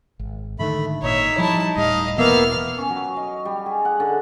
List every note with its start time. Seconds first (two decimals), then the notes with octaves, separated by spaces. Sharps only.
0.19 G#1
0.59 G#2 D3 D#3 A3 B5
1.02 G#1 A#2 D#4 C#5 E5
1.38 F3 G3 E4 A5
1.76 D1 A2 G3 D#5 F5
2.18 E1 B2 E3 A#3 B3 E5 F5 F6
2.78 C#4
2.90 F#3
3.17 D#5
3.45 G3
3.66 G#4
3.85 F#5
4.00 D3